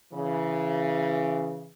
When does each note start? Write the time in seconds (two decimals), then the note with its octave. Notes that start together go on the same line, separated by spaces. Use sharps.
0.13 C#3 E3